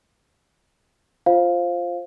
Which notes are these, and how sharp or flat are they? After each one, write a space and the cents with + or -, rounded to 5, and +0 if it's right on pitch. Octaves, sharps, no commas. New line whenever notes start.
F4 +0 C5 +10 F5 +0